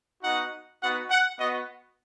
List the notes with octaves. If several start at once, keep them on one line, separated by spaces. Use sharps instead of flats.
B3 D#4 F#4 F#5
B3 D#4 F#4 F#5
F#5
B3 F#4 D#5